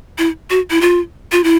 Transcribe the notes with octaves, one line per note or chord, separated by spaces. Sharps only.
E4
F#4
E4
F4
F4
E4